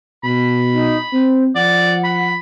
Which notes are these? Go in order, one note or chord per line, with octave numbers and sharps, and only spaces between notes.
B2 B5
D#4
C4 C5
F3 D5 F#5
B5